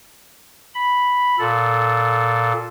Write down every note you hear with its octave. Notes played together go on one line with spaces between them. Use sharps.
B5
A#2 A4